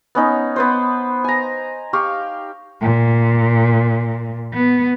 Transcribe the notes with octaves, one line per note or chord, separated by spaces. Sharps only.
B3 C#4 D#4
B3 B4 C5
G#5 A#5
G4 F5 C#6
A#2
B3